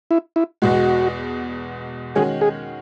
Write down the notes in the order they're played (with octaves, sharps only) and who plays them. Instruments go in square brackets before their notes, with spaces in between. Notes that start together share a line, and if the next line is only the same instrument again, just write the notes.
[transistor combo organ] E4
E4
[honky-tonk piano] E2 B2 G#3 [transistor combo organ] F#4
[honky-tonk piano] D#3 G#3 C#4 F#4 [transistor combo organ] G#4
[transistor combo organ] G#4